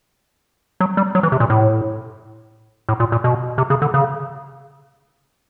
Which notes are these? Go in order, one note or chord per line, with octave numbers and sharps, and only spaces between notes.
F#3
G3
F#3
E3
C3
A#2
A2
A2
A#2
A#2
B2
C3
C#3
D3
C#3